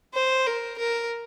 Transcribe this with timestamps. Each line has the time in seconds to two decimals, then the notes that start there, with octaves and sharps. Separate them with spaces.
0.14 C5
0.46 A#4
0.79 A#4